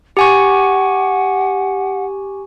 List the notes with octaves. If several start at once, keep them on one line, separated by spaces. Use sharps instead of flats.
G4 F#5 G#5 C#6